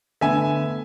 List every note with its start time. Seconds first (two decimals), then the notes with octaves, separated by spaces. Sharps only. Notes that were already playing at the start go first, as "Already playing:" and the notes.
0.21 D3 A3 B3 E5 G#5